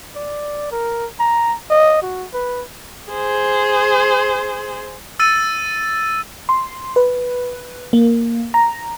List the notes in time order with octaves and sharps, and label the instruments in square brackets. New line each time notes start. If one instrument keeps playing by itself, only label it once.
[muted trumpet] D5
A#4
A#5
D#5
F#4
B4
[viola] G#4 C5
[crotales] E6 A6 D#7
[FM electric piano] C6
B4
A#3
A#5